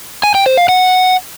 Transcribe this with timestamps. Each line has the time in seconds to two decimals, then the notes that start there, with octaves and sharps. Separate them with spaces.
0.23 G#5
0.35 G5
0.46 C5
0.57 F5
0.69 F#5